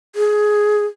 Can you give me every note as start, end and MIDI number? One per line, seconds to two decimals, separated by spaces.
0.16 0.85 68